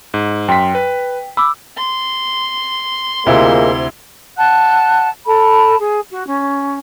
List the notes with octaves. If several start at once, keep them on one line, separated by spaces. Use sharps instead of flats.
G#2
F#2 G5 C6 B6
B4
B5 D6 E6
C6
D2 C3 G#3 A#3 E4 F4
F#5 A5 F#6
A4 A5 B5
G#4
F#4
C#4